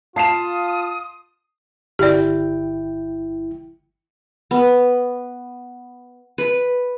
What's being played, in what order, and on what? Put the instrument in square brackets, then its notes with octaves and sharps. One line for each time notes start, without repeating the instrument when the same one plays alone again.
[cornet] F4 [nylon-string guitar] F5 [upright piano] A5 C7 E7 [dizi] D#6
[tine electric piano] G1 E4 G5 [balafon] G4 D5
[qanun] B3
B4